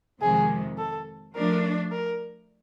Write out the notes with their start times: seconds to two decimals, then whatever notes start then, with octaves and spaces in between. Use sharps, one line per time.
0.22 F2 C3 D#3 G#3 G#4
0.78 A4
1.34 F3 A3 D4 A#4
1.92 A#4